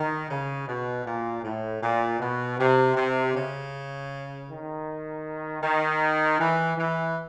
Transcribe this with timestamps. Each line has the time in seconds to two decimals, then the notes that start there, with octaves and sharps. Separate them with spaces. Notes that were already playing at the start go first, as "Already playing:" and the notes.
Already playing: D#3
0.29 C#3
0.67 B2
1.05 A#2
1.43 A2
1.81 A#2
2.19 B2
2.58 C3
2.95 C3
3.34 C#3
4.48 D#3
5.62 D#3
6.38 E3
6.77 E3